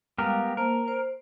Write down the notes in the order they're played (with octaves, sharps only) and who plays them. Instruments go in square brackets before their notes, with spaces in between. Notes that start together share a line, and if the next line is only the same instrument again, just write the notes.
[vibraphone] G3 G#3 F5 [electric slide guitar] B3 G4 A#4
[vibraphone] A#3 C5 A5 [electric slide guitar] A#4
[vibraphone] C5